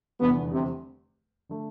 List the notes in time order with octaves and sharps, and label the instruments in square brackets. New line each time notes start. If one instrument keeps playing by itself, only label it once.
[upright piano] F1 E2 D3 G3 [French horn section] B3
[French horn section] C3
[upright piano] D3 A3